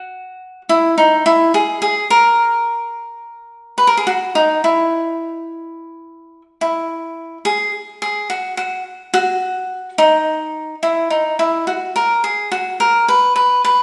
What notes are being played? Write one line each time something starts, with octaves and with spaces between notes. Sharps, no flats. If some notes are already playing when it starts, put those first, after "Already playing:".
Already playing: F#4
E4
D#4
E4
G#4
G#4
A#4
B4
A#4
G#4
F#4
D#4
E4
E4
G#4
G#4
F#4
F#4
F#4
D#4
E4
D#4
E4
F#4
A#4
G#4
F#4
A#4
B4
B4
B4